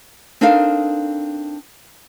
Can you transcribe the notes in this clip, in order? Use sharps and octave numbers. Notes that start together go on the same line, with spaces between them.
C4 D4 D#4 A4 A#4 F5